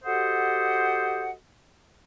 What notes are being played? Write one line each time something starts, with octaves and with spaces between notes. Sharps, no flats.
F#4 G4 A4 C5 D#5 F#5